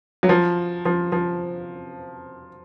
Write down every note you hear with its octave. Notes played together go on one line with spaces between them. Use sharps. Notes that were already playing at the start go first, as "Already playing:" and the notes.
F#3
F3
F3
F3